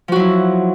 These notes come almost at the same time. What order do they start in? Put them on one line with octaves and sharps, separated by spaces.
F3 F#4 F#3 E4